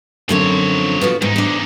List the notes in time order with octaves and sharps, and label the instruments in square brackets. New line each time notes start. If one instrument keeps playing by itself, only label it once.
[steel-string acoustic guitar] F#2 D3 C4 [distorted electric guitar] F3 C#5
[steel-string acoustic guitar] B3 F4 F#4
[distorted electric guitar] E2 D#4 [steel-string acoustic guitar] G#2
[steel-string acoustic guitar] D4 C5